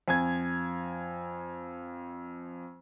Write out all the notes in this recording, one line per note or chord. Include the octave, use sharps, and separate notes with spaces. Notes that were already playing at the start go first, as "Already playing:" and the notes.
F2 G#5 G#6